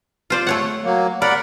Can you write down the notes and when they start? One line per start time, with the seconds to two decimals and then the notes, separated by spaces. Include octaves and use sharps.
0.30 F4 C5 D5
0.47 A3 C#5 F#5
0.84 F#3 A#3
1.22 A#4 D5 F#5 B5